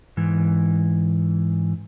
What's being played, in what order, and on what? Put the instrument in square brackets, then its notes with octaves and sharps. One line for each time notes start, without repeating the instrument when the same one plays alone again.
[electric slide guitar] G#2 E3